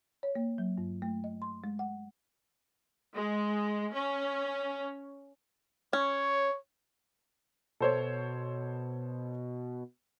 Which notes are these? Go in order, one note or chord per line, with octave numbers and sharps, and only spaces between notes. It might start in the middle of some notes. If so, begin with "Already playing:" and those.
C#5
A#3
F#3
G2
A3
D#5
C6
G#3
F#5
G#3
C#4
C#4 C#5
B2 A4 C5 C#5